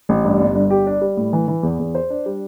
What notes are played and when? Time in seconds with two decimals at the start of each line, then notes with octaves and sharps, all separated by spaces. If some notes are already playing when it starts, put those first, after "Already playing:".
0.09 A1
0.25 G2
0.40 G1
0.55 G1
0.70 G4
0.87 D4
1.01 G3
1.17 A2
1.33 E3
1.48 E3
1.63 E2
1.79 E2
1.95 C5
2.10 D4
2.26 G3